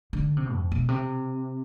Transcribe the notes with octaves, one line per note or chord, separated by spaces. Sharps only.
D3
C3
F2
B2
C3